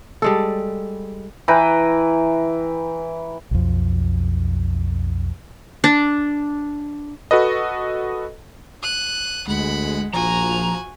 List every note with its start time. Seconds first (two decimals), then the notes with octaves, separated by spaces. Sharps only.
0.22 G3 G#3 A4
1.48 E3 B4 G5 A#5
3.51 B1 F2
5.84 D4
7.31 F#4 A4 B4 D#5
8.83 F#6 D#7
9.48 D2 G#3 F#5 B5
10.13 A#1 F3 F#4 G#5 A#5